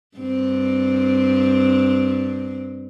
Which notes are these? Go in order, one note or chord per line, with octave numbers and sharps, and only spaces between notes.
G2 C4